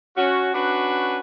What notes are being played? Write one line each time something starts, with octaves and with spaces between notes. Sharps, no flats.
C#4 F#4
C#4 D4 F#4 B4